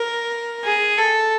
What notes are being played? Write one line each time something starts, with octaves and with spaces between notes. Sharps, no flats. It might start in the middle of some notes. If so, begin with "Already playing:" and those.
Already playing: A#4
G#4
A4